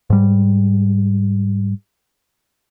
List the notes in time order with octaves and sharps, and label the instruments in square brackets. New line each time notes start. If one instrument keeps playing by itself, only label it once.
[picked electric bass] G#2 G3